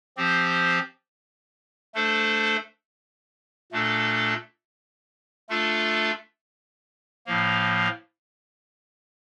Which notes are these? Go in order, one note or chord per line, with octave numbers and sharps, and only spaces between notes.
F3 C4 G4 C5
A3 D4 A4 C5
A#2 A3 D4 A4
A3 D4 F4 A4 E5
A2 F3 A#3